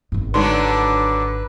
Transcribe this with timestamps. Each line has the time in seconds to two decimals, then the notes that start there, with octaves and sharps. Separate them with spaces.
0.12 G#1 G#2
0.34 D3 F#3 G#3 D4 D#4 B4 C6